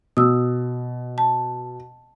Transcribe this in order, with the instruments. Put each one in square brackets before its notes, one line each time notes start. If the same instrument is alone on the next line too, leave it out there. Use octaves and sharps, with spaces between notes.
[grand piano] B2 [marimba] D#6 E6
[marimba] A5